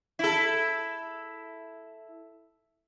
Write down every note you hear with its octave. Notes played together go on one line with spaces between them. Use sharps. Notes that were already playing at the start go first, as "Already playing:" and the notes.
E4 A4